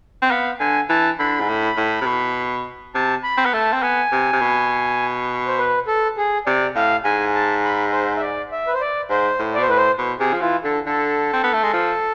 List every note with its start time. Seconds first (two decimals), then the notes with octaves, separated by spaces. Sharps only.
0.22 C4
0.31 B3 F5
0.60 D3 G#5
0.89 E3 A5
1.19 D3 B5
1.40 G#2
1.49 A2
1.77 A2
2.01 C3
2.06 B2
2.95 C3 A5
3.23 B5
3.37 C4
3.45 B3
3.53 A3 A5
3.73 C4
3.82 B3 G#5
4.12 C3
4.33 C3
4.41 B2
5.47 C5
5.59 B4
5.87 A4
6.17 G#4
6.47 C3 D5
6.75 A2 F5
7.04 G#2 G#5
7.35 A5
7.64 B5
7.92 C5
8.16 E5
8.22 D5
8.52 E5
8.67 B4
8.74 C5
8.81 D5
9.10 G#2 C5
9.39 A2
9.55 D5
9.58 B2 C5
9.69 A2 B4
9.77 C5
9.98 B2
10.20 C3 G#4
10.33 F3
10.41 E3 F4
10.64 D3 A4
10.86 D3 A4
11.33 C4
11.44 B3
11.53 A3
11.63 G#3
11.73 F3